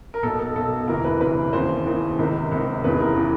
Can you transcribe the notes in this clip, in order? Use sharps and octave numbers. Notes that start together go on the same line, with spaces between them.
A#4
B1 B2 A4
A4
B1 B2 A4
E1 D2 C3 E3 A#4
B4
E1 D2 C3 E3 B4
D#2 C#3 E3 C5
D#2 C#3 E3
C#2 C3 D#3
C#2 C3 D#3
F1 E2 C#3 E3 B4
A#4
C#3 E3